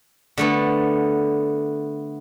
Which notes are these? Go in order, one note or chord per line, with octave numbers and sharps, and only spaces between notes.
D3 A3 B3